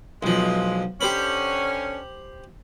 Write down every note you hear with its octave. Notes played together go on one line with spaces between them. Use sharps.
B1 C3 E3 F3 G#3
D3 C#4 G4 C5 B5